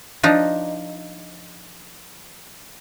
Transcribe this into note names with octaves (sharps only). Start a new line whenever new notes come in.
F3 D4 D#4